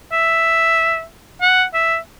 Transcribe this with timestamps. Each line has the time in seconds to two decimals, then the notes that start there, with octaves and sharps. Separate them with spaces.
0.12 E5
1.42 F#5
1.74 E5